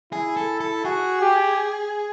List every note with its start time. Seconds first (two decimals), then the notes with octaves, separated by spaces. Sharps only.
0.12 E4 G#4
0.37 A4
0.60 A4
0.84 F#4 G#4
1.21 G4